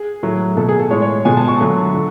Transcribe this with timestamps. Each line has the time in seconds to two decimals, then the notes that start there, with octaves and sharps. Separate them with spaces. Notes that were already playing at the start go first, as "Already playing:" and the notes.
Already playing: G#4
0.23 A2 F#3 A3
0.57 B2 A3 A4
0.69 G#4
0.79 A4
0.91 A2 G#3 C#5
1.02 C#5
1.25 B2 G#3 G#5
1.37 A5
1.48 C#6
1.60 D3 F#3 A3
1.94 D3